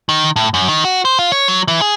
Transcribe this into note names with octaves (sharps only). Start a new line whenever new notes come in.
D#3
A2
F#2
D#3
F#4
C5
F4
C#5
F#3
E3
G#4